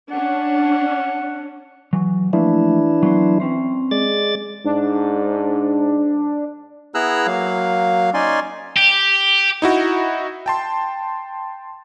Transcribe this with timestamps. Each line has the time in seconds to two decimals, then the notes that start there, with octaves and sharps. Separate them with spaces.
0.12 C#4 D4 F#5
1.93 E3 F#3
2.33 E3 F3 A3 A#3 D4 E4
3.03 F#3 B3 C5
3.40 C4 C#4 C5
3.91 G#3 D5 A6
4.65 G#2 D4
6.95 B3 E4 G#4 A#5 E6 F#6
7.27 F#3 A#3 F5
8.14 C#4 D#4 D5 G#5 C6
8.76 G4
9.62 D#4 E4 F#4
10.46 G5 A5 C6